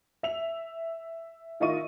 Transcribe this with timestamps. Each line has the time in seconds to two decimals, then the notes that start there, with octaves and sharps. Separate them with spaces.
0.23 E5 F7
1.60 D#3 E4 F4 D#5 C#6 D#7